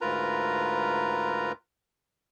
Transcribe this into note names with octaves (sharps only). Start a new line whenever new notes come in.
D2 G#2 F4 A#4 B4 A#5